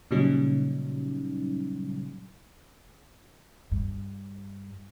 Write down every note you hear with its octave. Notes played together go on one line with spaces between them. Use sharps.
A#2 C#3 F#3 G3 C#4 D#4
G2